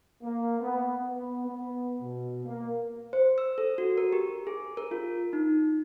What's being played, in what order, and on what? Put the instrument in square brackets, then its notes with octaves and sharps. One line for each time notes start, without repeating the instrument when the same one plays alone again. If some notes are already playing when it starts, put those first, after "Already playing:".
[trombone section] A#3
B3
B3
B3
B2
A#3
[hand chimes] C5
E6
A4
F#4
A#4
G4
G#4
A#4
F4
D#4